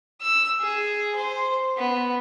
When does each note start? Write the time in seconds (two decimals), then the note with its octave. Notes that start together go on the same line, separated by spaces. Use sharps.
0.22 E6
0.61 G#4
1.16 C5
1.78 B3